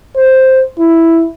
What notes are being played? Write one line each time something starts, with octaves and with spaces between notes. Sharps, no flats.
C5
E4